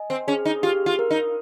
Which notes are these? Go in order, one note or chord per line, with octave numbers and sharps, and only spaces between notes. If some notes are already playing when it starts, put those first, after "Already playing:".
Already playing: D#5 G#5
C4
C#4 G#4
D#4
F4 G4
F4
A#4
D#4